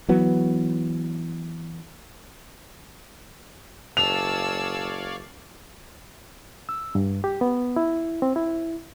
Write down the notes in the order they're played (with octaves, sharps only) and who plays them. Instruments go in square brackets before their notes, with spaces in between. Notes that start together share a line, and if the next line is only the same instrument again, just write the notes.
[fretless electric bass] E3 F#3 B3
[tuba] F#1 [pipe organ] C#5 D5 F5 [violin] A5 E6 [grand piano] F7
[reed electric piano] E6
G2
G4
B3
E4
C4
E4